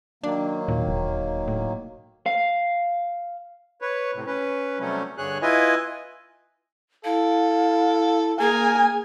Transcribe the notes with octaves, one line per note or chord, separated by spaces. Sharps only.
D#3 F#3 A#3 D4
D#2 A#2
D1
A2
F5
B4 C#5
A2 C3
C#4 B4
C3 F#3 G3 A3 C#4
G2 D3 G#4 C#5 F#6
E4 F4 B4 D#5 G#5
E4 A4 F5
A#3 G#4 A#4 G#5